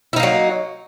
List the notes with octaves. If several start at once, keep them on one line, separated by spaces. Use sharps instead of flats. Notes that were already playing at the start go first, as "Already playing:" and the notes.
F#3 A#3 D#4 E4